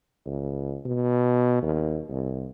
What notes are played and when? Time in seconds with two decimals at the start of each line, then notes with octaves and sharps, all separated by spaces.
0.26 C#2
0.85 B2
1.62 D#2
2.09 C2